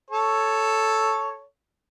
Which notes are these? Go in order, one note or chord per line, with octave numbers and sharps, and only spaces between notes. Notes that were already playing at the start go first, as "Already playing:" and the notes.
A4 C#5